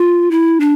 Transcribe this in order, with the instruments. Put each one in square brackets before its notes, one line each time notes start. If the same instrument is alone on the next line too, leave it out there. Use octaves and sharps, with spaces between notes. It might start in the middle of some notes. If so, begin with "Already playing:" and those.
Already playing: [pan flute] F4
E4
D4